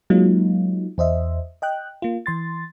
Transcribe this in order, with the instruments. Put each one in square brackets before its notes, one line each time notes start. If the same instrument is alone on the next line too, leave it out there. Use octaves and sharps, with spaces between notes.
[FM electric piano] F#3 G#3 A#3 D#4 F4
E2 C5 D#5 E5
D#5 G5 F#6
A#3 F4
E3 C6 A6